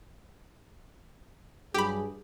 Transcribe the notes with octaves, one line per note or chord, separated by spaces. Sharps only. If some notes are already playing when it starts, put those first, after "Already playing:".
G2 F#3 G4 G#4 B5